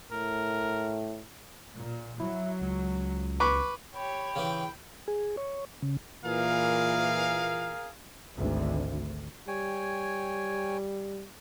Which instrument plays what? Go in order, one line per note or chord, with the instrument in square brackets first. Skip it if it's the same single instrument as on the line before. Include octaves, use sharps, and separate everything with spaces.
[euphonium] A2 [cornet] A#4
[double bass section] A#2
[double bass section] F#3 [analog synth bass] E4
[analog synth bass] C#2
[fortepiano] B4 C#6 D6
[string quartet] G4 C#5 [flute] B5
[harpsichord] C#3 E3 [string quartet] G5
[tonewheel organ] G#4
C#5
C#3
[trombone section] A#2 E3 [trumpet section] G#4 A#4 F5
[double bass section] G#1 D2
[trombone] G3 [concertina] C#5 G5 G#5